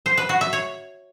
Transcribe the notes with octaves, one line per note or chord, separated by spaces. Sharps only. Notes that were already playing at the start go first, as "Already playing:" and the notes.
C5
B4
F#4
E5
C#5